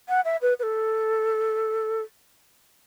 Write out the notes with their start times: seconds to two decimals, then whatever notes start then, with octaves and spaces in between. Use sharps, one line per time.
0.09 F#5
0.25 E5
0.42 B4
0.59 B4
0.63 A4